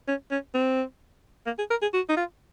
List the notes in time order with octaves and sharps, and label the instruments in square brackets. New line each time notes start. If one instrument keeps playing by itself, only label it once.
[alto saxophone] C#4
C#4
C4
A#3
G#4
A#4
G#4
F#4
D#4
F4